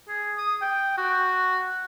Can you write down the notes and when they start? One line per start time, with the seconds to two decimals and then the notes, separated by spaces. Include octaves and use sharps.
0.09 G#4
0.38 D#6
0.62 G5
0.98 F#4